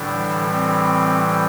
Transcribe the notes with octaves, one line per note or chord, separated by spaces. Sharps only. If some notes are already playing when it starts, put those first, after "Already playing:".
Already playing: A2 D3 E3 G3 D4
C4